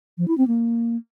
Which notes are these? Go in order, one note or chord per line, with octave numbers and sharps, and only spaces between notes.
F3
E4
C4
A#3